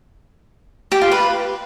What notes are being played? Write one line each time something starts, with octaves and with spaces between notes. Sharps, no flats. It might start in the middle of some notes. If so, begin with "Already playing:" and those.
G4
F4
B4